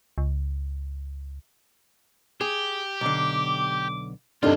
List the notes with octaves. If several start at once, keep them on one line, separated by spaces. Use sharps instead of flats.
C#2
G4 G#4
B1 D3 D6
D2 G2 C3 D4 D#4 F4 A4